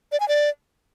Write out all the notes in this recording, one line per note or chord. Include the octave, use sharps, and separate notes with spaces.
D5
G#5
D5